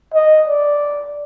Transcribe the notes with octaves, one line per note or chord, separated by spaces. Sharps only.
D#5
D5